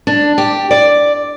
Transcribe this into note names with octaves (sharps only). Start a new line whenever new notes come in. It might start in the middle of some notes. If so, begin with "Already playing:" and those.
D4
G4
D5